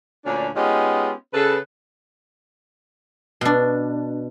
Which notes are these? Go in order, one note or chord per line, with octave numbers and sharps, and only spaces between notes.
D2 A#2 C#4 D4
G#3 B3 C#4 D#4 F4 G4
C#3 A4 B4
B2 D4